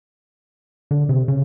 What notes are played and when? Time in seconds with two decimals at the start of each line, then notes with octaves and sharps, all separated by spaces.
0.91 D3
1.09 C3
1.28 C#3